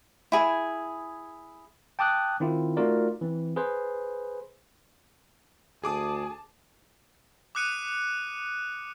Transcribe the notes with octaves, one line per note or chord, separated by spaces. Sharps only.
E4 G#4
G5 A5 D6 D#6 F#6
D#3 C4 E4 F4
A3 D#4 F4 F#4 A#4 D5
E3 C4
G#4 B4 C5
D2 G#4 A5 D6 D#6
D6 D#6 F#6 C#7 D#7